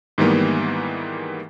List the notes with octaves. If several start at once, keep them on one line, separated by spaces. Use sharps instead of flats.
G#2 D#3 E3 G3 A#3 B3